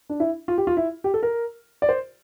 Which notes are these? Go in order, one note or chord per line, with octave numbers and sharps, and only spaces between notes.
D4
E4
F4
G4
F4
E4
G4
A4
A#4
D5
C5